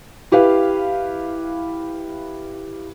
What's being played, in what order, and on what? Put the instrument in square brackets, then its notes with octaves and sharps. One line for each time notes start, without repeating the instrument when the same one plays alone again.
[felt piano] E4 G4 B4 F5